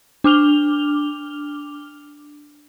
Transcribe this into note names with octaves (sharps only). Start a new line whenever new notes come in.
D4 D6 F6 F7 G7